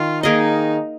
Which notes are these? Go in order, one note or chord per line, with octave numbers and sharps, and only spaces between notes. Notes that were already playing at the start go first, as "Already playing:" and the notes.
Already playing: D#3 F4
D#3 A#3 D#4 G#4 D#5